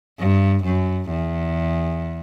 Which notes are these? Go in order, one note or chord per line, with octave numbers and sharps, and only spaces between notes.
G2
F#2
E2